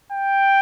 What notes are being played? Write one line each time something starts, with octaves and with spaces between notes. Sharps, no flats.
G5